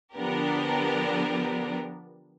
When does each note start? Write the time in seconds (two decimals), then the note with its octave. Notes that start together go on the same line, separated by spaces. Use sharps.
0.15 D3 F3 B3 D4 G4 A#4